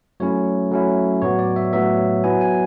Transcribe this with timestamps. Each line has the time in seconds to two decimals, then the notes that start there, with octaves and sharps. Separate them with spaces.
0.20 F#3 A3 C#4 E4 C#5
0.71 F#3 A3 C#4 E4
1.22 A2 F#3 B3 C#5
1.39 D5
1.56 E5
1.73 A2 F#3 B3 E5
2.24 F#3 B3 E4 G#5
2.41 G#5